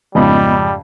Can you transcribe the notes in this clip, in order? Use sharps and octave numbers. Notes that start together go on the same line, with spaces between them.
F2 G#2 C#3 G3 B3 D#5 B5